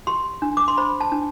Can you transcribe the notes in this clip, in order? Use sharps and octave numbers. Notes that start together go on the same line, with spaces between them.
G4 C6
D4
D6
C6
C5 B5
A5
D4